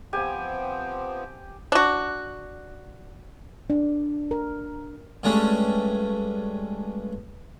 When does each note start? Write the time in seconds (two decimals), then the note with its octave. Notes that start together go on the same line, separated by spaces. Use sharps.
0.13 F3 B3 C4 G4 G#5
1.72 D4 F#4
3.70 D4
4.31 A#4
5.23 G2 G#3 A3 C#4